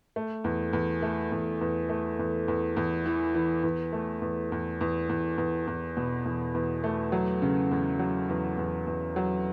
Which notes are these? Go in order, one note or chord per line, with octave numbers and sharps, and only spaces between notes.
A3
E2
E2
A3
E2
E2
A3
E2
E2
E2
E3
E3
E2
A3
E2
E2
E2
E2
E2
E2
B2
E2
E2
A3
F#3
C#3
E2
F#3
E2
E2
E2
F#3